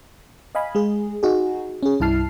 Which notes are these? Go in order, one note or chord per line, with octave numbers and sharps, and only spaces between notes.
D#5 F5 G#5 B5
G#3 G#4
D#4 F#4 G#4
C#4 G#4
C2 G2 E4 A5 F6 C7